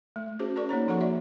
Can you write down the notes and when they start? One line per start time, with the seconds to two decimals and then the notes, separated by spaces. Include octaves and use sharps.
0.16 A3
0.39 C#4 F#4 G#4 C5
0.56 C#4 G#4 A#4 D5 C#6
0.69 A#3 D#4 C#5 A#5
0.88 F3 F#4 A4 F#5 C#6
1.01 D5 E5